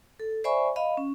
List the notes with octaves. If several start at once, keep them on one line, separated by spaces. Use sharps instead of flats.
A4
C5 D5 E5 G#5 B5 C#6
D#5 F5 B5
C#4